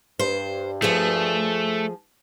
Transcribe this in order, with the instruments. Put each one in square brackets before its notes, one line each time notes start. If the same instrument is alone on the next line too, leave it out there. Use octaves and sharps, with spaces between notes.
[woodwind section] G2 [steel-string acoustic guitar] C5
[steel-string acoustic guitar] F3 G#4 [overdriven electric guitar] A3